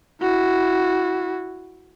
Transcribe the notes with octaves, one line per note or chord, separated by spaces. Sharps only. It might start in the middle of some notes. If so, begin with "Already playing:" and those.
E4 F#4